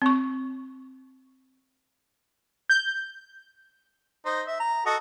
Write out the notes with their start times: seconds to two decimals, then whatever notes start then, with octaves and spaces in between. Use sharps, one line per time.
0.02 C4 C#6
2.70 G6
4.25 D#4 C5
4.47 E5
4.60 A#5
4.86 F#4 A4 D#5